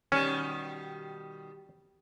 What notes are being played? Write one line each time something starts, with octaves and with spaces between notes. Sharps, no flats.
B2 D#3 G3 C#4